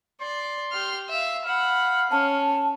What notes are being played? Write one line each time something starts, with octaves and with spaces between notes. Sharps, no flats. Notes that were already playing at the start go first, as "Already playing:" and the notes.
D5 C6
G4 F6
E5 F5
F5 F#5 B5
C#4 A5